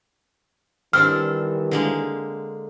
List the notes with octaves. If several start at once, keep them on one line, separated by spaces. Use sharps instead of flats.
D#3 E3 G3 C4 D4 A4 F6
D3 G#3 A#3